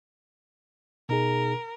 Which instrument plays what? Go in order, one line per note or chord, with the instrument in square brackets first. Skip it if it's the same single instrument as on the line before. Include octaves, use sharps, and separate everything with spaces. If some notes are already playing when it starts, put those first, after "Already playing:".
[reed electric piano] B2 D#4 G#4 [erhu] A#4